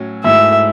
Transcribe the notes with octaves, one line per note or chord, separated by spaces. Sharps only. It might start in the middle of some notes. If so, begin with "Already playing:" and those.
Already playing: A2 F#3 C#4
G#2 F#3 A3 E4 E5